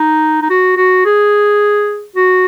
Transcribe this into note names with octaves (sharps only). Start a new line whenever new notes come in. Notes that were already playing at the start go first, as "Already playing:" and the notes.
Already playing: D#4
D#4
F#4
F#4
G#4
F#4